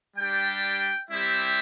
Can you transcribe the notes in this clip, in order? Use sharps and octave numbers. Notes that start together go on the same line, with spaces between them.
G3 D4 G4 G5
G3 C4 E4 G4 E5